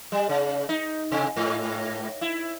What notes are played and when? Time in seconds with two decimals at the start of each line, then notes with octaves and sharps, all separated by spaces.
0.12 G3
0.29 C#3
0.69 D#4
1.12 C3
1.36 G#2
2.21 E4